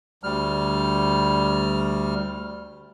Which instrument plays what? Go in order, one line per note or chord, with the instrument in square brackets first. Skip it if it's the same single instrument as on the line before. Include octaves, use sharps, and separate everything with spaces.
[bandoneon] D2 G3 F6